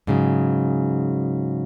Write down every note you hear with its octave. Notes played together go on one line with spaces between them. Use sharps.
G#2 C#3 F#3